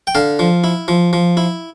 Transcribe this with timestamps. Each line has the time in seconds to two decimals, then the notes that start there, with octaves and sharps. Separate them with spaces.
0.07 G5
0.15 D3 F5 A5
0.39 F3
0.64 E4
0.88 F3
1.13 F3
1.37 E4